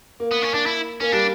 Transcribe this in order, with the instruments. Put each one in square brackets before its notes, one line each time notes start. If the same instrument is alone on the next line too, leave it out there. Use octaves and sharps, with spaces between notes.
[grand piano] A#3
[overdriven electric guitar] B3
C#4
D4
E4
[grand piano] A#3 [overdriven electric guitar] C#4
[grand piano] G3 [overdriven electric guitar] D4